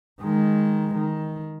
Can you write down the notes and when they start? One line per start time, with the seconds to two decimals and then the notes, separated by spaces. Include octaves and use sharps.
0.22 D#3 G#3
0.95 D#3